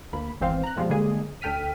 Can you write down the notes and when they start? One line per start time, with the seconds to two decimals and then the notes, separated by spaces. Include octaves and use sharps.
0.13 D2 A#3 B5
0.41 G#1 E2 E3 C4 C5 F5
0.63 A#5 F#6
0.76 F2 B2 F3 G3 G#3 F4
0.90 D3 G3 G#3 A#3 G#4
1.41 D2 A4 G5 F6 B6 D#7